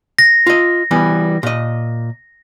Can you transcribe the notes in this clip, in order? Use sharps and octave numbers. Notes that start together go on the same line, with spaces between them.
A#6
F4 D#5
E3 G3 B3
A#2 D#5